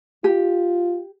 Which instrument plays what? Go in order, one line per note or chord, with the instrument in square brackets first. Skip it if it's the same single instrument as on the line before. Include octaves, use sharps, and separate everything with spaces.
[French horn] F4 [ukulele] G4